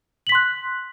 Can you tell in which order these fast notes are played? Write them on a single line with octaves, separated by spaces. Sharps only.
F#7 B6 C6 F#6